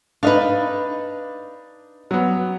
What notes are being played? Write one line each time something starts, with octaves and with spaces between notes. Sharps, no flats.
D4 D#4 B4 F5
F#3 B3